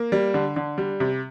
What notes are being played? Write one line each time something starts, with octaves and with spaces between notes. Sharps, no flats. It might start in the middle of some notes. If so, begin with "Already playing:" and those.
Already playing: A#3
G3
D3
D3
G3
C3